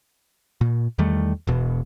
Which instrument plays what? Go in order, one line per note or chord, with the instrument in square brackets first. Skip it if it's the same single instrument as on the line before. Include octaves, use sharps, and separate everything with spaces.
[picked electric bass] A#2
E2 D#3 G3 A3
E1 B2